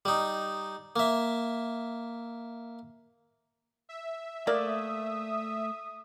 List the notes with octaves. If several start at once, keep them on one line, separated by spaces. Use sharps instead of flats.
G3 D#4
A#3 E5
E5
A3 A#3 D5 D#6